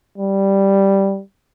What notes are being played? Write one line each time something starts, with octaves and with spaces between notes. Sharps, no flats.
G3